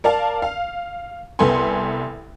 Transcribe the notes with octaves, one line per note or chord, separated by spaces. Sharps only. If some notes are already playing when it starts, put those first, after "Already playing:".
A#4 D5 F5 A5
F5
C2 B3 A4 G#5 C6